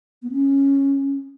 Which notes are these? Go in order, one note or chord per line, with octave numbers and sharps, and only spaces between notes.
B3
C#4